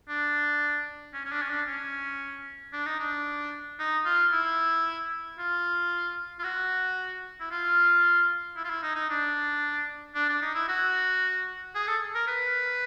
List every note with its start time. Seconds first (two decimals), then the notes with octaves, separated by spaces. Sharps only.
0.09 D4
1.14 C#4
1.25 C#4
1.32 D4
1.42 C#4
1.50 D4
1.68 C#4
2.73 D4
2.86 D#4
3.00 D4
3.79 D#4
4.06 F4
4.32 E4
5.39 F4
6.39 F4
6.44 F#4
7.40 E4
7.51 F4
8.57 E4
8.64 F4
8.70 E4
8.83 D#4
8.96 D#4
9.10 D4
10.15 D4
10.29 D4
10.42 D#4
10.55 E4
10.68 F#4
11.75 G#4
11.87 A4
12.15 A#4
12.27 B4